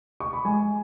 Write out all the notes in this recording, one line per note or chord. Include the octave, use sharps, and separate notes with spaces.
C#6
B5
G#3 G#5